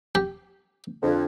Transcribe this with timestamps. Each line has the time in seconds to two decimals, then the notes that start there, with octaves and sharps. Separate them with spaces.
0.15 G4
1.03 F2 D3